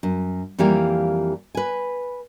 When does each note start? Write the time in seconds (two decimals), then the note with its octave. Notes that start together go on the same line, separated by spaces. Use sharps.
0.03 F#2
0.59 F2 E3 G3 A#3 G4 F5
1.55 B4 G#5